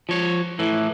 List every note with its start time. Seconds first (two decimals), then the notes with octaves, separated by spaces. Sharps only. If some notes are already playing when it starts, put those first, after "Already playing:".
0.09 F3 C#5
0.59 A2 E3